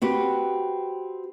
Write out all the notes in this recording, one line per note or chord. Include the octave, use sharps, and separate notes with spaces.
C4 F#4 G4 B4